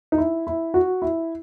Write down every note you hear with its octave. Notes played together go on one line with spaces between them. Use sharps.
D#4
E4
E4
F#4
E4